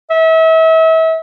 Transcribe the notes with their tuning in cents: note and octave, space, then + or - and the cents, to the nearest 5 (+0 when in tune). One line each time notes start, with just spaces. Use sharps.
E5 -35